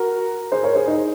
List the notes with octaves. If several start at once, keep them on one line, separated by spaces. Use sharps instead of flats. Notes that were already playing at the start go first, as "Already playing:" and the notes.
Already playing: F#4 A#4
G#4 C5
A#4 C#5
G#4 C5
D#4